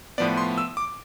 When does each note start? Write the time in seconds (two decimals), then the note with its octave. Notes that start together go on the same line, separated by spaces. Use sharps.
0.18 A2 F3 B3 D5
0.38 C6
0.58 E6
0.77 D6